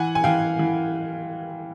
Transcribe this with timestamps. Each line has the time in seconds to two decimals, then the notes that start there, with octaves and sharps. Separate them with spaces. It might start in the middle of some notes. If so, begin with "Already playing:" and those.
Already playing: E3 F#5 G#5
0.15 G#5
0.24 E3 F5 G5
0.59 E3